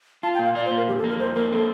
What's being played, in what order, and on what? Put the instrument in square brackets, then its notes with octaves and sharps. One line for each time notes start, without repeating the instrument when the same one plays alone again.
[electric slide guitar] F4 [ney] A5
[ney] G5
[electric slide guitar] A#2
[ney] F5
[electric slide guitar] F4 [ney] D5
[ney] C5
[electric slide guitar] A#2
[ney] A#4
[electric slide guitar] F2 [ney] G4
[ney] A4
[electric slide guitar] A#3
[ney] A#4
[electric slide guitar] F2 [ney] C5
[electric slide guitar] A#3 [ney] A#4
[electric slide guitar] C4 [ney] A4